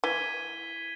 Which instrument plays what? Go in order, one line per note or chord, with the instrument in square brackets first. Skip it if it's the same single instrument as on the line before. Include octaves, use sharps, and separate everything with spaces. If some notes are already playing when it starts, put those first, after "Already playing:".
[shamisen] E3 [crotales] G#6 B6 D#7 G7